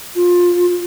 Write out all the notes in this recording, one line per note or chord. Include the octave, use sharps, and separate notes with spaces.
F4